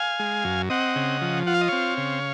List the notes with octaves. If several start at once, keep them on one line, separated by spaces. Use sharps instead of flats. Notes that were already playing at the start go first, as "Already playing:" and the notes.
Already playing: F5 G#5
G#3
F#2
C4 D#5 F#5
C#3
F3
F4 F#5
F5
D#5
C4 C#5 F5
C#3